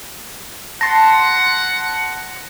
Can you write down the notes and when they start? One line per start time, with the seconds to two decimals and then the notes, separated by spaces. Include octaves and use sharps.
0.81 F#5 A5 C6 A#6